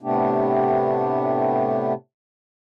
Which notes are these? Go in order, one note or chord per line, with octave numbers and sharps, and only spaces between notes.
A2 C3 A3 B3 D4 G4